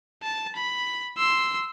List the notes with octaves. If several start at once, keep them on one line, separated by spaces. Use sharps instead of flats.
A5
B5
C6 E6